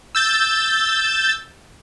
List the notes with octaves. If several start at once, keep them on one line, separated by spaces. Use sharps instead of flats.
E6 G6 A6